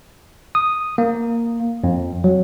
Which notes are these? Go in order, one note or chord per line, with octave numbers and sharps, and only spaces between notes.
D#6
A#3
F2
F#3